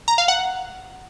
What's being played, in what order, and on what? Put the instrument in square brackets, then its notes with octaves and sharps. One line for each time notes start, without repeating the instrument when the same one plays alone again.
[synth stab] A#5
F5
F#5